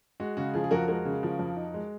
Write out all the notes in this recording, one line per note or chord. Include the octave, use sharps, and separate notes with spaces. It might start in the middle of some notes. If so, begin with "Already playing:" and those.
G#3 F#4
C#3 F#4
F3 G#4
G#4
F2 F#4 A#4
G#3 F#4 A#4
C#3
F3
F2
D#4
G#3